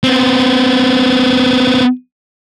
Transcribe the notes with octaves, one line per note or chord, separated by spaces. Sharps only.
B3 C4